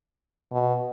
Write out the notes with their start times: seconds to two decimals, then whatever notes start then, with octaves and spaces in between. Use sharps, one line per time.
0.51 B2